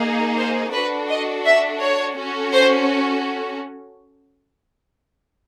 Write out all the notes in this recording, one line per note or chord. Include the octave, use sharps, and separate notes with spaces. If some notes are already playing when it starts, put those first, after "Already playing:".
Already playing: A#3 D#4 G#4
C5
D4 F#4 A4 B4
D#5
E5
C#5
C#4 F#4 A4
C5